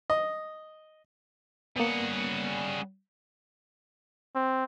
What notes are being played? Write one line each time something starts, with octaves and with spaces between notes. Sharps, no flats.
D#5
G3 A#3 B3 C#4 G#4 F#5
C4